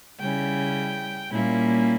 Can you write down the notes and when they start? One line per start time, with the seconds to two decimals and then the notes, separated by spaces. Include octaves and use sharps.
0.19 C#3 G3 C#4 E4 G5
1.30 A#2 G3 A#3 C#4 E4